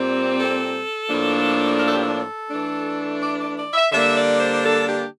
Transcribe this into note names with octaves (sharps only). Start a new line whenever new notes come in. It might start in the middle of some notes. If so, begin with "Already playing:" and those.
Already playing: A#2 G3 C4
A4
A2 F3 A#3 D4
A#4
A4
G4
A4
E3 A3 D4
D5
D5
D5
E5
D3 G3 A#3 D4 E5
D5
C5
A4
G4